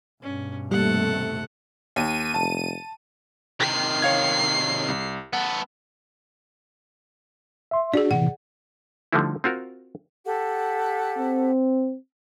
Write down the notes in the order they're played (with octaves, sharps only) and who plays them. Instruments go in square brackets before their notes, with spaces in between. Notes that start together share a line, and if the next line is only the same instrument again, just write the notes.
[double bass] G2 B2 [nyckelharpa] C#4
[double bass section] D#2 C3 A3 [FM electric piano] G3 A#3 [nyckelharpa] A4 F#5
[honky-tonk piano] D#2 [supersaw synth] D#7
[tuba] F1 [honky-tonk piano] A5
[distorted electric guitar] C3 D#3 [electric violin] C7
[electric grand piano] C#5 F5 G#6
C2
[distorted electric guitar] B3 A4 [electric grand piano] F#5
[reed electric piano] E5 C6
[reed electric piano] D4 F#4 [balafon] G#4 D5
[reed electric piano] A2 C3 E3 [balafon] F#5
[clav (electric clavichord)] D3 F3 G3 A3 D#4 E4
C4 F4 F#4 A#4
[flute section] G4 A4 F#5
[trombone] C4